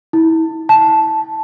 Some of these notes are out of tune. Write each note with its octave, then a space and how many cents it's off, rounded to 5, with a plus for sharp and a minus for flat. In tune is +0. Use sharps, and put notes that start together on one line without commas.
E4 -30
A5 -5